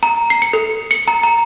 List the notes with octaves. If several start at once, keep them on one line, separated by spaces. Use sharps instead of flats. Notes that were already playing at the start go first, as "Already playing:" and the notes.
A#5
C7
C#7
A4
C#7
A#5
A#5